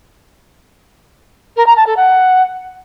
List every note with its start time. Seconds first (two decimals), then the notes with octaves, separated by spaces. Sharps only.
1.57 A#4
1.67 A#5
1.77 A5
1.87 A4
1.97 F#5